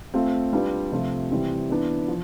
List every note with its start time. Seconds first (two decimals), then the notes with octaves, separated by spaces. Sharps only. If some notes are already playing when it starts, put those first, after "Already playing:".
0.14 A3 C4 F4
0.53 G3 D4 F4 B4
0.92 C3 F3 A3 C4 F4
1.31 C3 E3 G3 C4
1.70 E3 B3 D4
2.08 F3